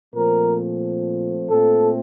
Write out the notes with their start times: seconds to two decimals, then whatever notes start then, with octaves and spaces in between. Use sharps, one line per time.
0.15 A#2 F3 A3 C4 A#4
1.49 A#2 A3 C4 A4